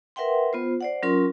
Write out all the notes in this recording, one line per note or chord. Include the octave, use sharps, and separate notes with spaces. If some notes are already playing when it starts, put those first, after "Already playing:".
A#4 B4 E5 F#5 G5 C6
B3 F4 C5
C5 D5 F#5
F#3 C#4 F4 A#4 C6